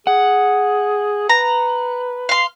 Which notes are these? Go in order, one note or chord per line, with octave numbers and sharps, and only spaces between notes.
G#4 F#5
B4 A#5
F5 C6